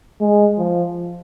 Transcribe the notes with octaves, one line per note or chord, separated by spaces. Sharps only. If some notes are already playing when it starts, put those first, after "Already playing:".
G#3
F3